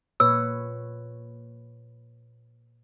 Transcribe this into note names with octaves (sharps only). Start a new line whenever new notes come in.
A#2 B4 C#5 E6